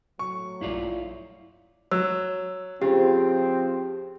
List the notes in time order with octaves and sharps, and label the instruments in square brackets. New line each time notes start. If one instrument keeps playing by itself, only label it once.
[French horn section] A2 F#3 [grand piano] C#6
[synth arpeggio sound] A#1 G2 [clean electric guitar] E4 F4 D5
[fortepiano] F#3 [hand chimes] E6
[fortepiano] C#3 [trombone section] F3 C4 [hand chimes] G4